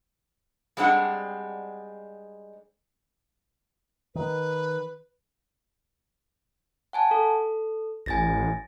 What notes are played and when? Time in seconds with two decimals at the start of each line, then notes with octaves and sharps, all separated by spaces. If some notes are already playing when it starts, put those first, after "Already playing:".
0.77 G3 G#3 C4 D4 F#5
4.15 D#3 B4
6.93 F#5 G#5 A5
7.11 A4
8.06 A1 G#5 A6 A#6